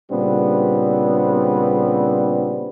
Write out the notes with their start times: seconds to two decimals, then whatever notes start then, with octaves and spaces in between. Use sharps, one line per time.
0.11 A#2 C#3 G3 B3 C4 D4